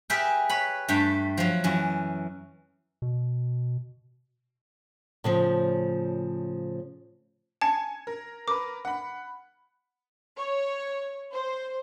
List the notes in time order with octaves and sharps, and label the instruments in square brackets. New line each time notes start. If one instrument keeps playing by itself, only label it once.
[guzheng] G4 G#4 A#4 B4 E5 G5
B4 C#5 B5
G2 A3 G5 A5
F3 F#3
F#2 E3 F#4
[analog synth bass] B2
[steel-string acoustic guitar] A2 C#3 F3
[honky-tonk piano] G#5 G#6 C#7 [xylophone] A5
[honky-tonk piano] A#4
[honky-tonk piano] A#4 B4 [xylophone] D6
[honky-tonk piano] F#5 B5
[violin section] C#5
C5